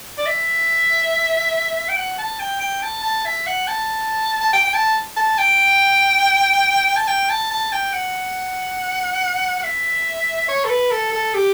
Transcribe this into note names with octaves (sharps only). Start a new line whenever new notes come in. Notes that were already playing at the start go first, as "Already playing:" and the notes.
D5
E5
G5
F#5
A5
G5
G5
A5
A5
E5
F#5
A5
A5
G5
G5
A5
A5
G5
A5
G5
A5
A5
G5
F#5
F#5
E5
C#5
A4
B4
A4
A4
G4